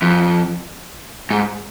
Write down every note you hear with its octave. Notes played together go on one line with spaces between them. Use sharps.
F2
G#2